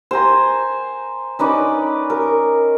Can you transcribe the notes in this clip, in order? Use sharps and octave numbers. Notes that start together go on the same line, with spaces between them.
C5 G5 G#5 A#5
C#4 D#4 B4 D5
A#4